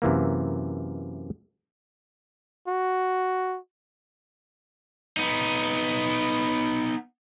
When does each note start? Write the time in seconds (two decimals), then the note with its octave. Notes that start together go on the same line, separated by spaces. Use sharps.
0.02 F#2 C3 E3 A#3
2.67 F#4
5.17 B3 D#4